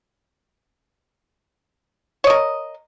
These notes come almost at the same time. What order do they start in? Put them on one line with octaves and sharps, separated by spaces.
C#5 D#5 A#4